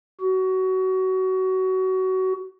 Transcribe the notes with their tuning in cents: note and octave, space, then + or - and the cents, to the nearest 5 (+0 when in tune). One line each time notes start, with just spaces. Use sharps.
F#4 +25